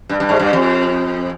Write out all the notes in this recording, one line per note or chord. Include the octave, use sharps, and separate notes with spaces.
G2
G2
G#2
G2
F2